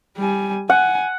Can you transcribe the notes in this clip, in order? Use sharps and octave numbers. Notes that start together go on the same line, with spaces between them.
G3 G#5
F#5 G#5